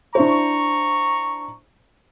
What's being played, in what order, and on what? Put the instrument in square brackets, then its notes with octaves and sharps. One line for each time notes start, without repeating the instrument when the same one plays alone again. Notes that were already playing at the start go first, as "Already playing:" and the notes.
[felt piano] D4 E4 C5 [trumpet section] A#5 C#6